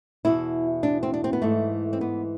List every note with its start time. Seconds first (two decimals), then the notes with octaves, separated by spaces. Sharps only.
0.25 E2 B2 E4
0.83 D4
1.03 C4
1.14 D4
1.24 C4
1.33 B3
1.42 G#2 E3 A3
1.93 C4
2.01 B3